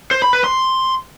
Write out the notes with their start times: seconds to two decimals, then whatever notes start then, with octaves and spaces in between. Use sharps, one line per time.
0.11 C5
0.22 B5
0.33 B4
0.44 C6